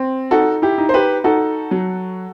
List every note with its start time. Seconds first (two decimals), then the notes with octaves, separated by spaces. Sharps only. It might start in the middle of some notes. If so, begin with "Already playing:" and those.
Already playing: C4
0.31 D#4 F#4 A4
0.62 E4 G4
0.78 D#4
0.89 C5
0.94 G4 B4
1.24 D#4 F#4 A4
1.71 F#3